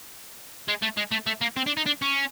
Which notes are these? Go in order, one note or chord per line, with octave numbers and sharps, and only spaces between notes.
G#3
A3
G#3
A3
A3
A#3
C4
D4
D#4
D4
C#4